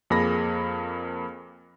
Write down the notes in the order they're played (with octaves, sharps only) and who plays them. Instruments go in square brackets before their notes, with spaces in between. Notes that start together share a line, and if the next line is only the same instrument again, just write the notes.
[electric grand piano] F2 A#3 G#4 B5 A#6